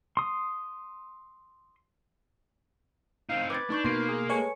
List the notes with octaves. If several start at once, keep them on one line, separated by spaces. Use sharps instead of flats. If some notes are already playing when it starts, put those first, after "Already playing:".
C6 D#6
C4 D#4 F5
B4 D6 G#6 A6
D4 D#4 C#6 G6
B2 A#3 C6 C7
G#4
G#3 A4 B4 C#5 G#5 C#6